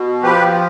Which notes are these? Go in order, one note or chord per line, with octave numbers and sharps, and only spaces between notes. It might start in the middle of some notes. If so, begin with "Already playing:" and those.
Already playing: B2
F3 G4 B4